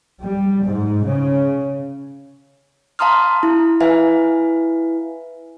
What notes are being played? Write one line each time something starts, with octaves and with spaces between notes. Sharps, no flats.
G3
G#2
C#3
F5 A5 A#5 C6 D#6 F6
E4
E4 B4 E5 F5 G#5